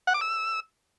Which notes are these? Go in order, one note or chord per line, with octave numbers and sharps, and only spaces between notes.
F#5
D6
E6